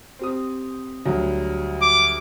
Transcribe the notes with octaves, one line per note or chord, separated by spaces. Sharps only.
C4 G4 D#6
D2 F#3 G3
D6